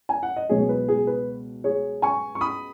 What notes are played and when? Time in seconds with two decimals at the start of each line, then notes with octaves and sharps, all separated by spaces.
0.09 G#5
0.23 F#5
0.36 D#5
0.49 C#2 B2 F#3 G#4 C#5
0.69 B4
0.88 G#4
1.07 B4
1.64 G#4 C#5
2.02 G#5 C#6
2.35 C#6
2.41 B5 D#6